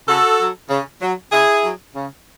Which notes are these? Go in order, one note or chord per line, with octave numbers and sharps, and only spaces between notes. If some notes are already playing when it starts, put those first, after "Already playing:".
C#3 F#4 A4
F#3
C#3
F#3
C#3 E4 G#4
F#3
C#3